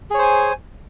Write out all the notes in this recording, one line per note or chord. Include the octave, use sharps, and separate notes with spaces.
G#4 C5 C#5 G#5